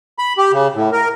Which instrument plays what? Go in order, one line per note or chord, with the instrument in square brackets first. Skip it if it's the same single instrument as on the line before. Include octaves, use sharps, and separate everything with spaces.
[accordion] B5
G4
C#3
A2
A#4